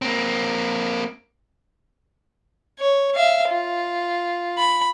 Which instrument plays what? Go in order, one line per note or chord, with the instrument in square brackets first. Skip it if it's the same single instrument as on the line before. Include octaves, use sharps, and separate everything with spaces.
[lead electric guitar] A#3 C4
[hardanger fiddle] C#5
E5 F5
F4
B5